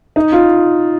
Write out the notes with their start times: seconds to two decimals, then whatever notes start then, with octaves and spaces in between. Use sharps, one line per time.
0.16 D#4
0.32 F4